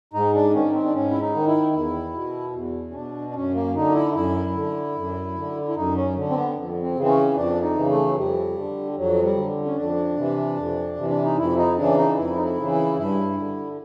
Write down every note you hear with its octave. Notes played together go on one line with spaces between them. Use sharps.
G#2 D#4
D4
D#3 C#4
C4
D4
G#2 C#4
E4
D#4
D#3
E4
E2 E4
B2
E2
C#4
B2 D4
D4
F#2 C#4
A#3
D3 D#4
E4
F#2 E4
D3
F#2
D3
E4
F#2 D#4
C#4
D3
C4
B3
F2
C4
C#3
E3 C4
C#4
F2 D4
D#4
C#3 E3
A3
F#3
F2 G3
D3
F2 F#3
G3
D3
C#4
F2 D4
C3 E3
F2
C3 E3
D4
D#4
F2 E4
D#4
C#3 E3 D4
D#4
F2 E4
D#4
E4
C#3 E3
E4
G2 E4
D3